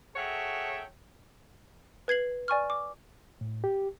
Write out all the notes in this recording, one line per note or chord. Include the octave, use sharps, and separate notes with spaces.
F#4 G#4 A4 C#5 E5 G5
B4 G#6 C7 F#7
D5 G#5 C#6 F6
D6
A2
G4